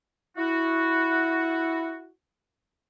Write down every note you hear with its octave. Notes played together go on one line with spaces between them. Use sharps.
E4 F#4